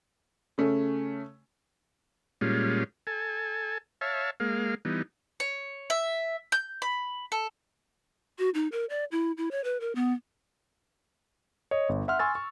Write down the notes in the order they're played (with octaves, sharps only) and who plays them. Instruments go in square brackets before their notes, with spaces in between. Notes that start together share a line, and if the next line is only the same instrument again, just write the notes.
[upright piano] C#3 A3 C#4
[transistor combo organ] A#2 G3 G#3 C#4 F4
A4 G#5
C#5 E5 F5 A5
G#3 A#3 F5
E3 G3 B3 D#4
[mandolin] C#5
E5
G6
B5
A4
[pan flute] F#4
D#4
A#4
D5
E4
E4
C#5
B4
A#4
B3
[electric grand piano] C#5 D#5
G1
E5 F#5 C6 F6
G#5 C6 C#6 E6 A6
C#6